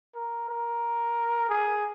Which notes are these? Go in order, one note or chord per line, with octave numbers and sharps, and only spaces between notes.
A#4
A#4
G#4